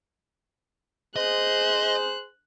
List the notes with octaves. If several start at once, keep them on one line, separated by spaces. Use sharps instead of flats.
G#4 C5 D#5 F#6